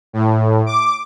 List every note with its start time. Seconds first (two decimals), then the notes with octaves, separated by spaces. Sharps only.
0.13 A2
0.66 D6